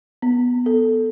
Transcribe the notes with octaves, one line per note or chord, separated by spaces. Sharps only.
B3
A4